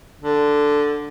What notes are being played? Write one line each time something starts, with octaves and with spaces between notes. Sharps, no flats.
D3